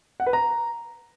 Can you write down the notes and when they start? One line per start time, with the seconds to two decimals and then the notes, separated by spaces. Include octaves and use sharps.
0.20 F#5
0.26 B4
0.33 A#5